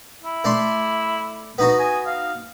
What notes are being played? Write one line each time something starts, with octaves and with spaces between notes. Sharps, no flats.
E4
A3 D5 C6
B3 D#4 F#4
G#5
F5